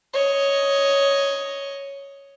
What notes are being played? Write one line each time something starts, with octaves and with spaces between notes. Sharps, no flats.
C#5 D#5